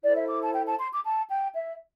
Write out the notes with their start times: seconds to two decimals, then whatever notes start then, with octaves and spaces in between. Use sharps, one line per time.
0.03 E4 A4 C5 D5
0.16 E5
0.29 D6
0.42 A5
0.54 G5
0.67 A5
0.79 C6
0.92 D6
1.04 A5
1.30 G5
1.55 E5